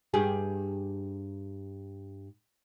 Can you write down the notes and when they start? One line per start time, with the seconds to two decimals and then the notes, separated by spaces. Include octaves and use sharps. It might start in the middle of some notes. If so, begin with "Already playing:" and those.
0.14 G2 G4 G#4